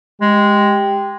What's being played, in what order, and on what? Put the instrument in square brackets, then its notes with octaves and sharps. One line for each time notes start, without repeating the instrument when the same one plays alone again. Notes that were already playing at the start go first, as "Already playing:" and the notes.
[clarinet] G#3 [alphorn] G4